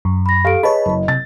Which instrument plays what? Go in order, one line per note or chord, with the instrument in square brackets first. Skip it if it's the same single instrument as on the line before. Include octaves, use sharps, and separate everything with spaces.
[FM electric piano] F#2
[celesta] B5 A#6
[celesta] G4 A4 D7 [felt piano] F5
[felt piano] G#4 B4 [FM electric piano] C#5 A5 B5 [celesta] D#5
[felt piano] F#1
[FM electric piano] C3 [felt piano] A6